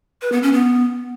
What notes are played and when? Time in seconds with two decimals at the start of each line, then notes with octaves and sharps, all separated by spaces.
0.22 B4
0.32 B3
0.43 C#4
0.53 B3